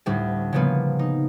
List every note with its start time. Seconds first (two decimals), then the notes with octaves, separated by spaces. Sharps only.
0.06 D2 A2 G3 D4
0.53 C#3 F3 G3 A#3 B3
0.99 D#4